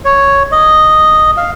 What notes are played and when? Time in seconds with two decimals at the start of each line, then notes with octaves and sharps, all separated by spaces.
0.05 C#5
0.52 D#5
1.37 F5